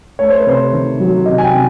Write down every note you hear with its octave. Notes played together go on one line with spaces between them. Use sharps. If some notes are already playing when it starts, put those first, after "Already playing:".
A3 C#5
C5
B4
C3 C5
D#3
F#3
C3 D#5
G#5
G5
C3